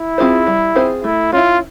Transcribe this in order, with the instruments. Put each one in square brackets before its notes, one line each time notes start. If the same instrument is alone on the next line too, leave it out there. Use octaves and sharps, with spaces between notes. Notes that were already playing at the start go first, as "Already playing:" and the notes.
Already playing: [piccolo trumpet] E4
[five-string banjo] C4 F4 G#4 C5
G3
C4 F4 G#4 C5
[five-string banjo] A3 [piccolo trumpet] E4
[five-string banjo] C#4 E4 [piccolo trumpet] F4